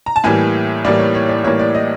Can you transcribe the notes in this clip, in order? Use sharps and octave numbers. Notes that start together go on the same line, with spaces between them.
A#5
A5
A2 E3 G3 A#3 G#5
A2 E3 G3 A#3 D5
C#5
C#5
D5
A2 E3 G3 A#3 C#5
D5
D#5